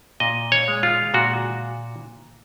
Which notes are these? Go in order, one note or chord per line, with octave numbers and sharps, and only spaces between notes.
A#2 D#5
C#5
G#3
F4
A#2 F#4